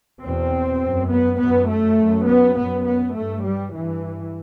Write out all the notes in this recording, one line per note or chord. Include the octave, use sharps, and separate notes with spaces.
E2 B2 C4
F#2
B3
F#2 B3
A3
F#2
B3
F#2 B3
B3
G2 A3
G3
G2 E3